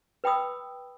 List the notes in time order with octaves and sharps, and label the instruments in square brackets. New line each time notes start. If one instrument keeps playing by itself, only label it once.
[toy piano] B4 G5 B5 D#6 E6